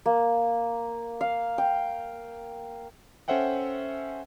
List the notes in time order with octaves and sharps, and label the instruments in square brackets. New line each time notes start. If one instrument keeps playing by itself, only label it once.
[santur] A#3
F5
G5
[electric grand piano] C#4 A4 C5 E5 F#5 G5